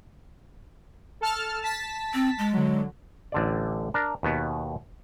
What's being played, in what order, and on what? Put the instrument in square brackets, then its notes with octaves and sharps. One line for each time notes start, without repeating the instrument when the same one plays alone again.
[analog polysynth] A4 A5 F6
A5 A6 B6
[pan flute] C4
G#3
[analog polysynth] D3 F#3
[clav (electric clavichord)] A1 D3 D5
D4 A#4
D#2 B2 B3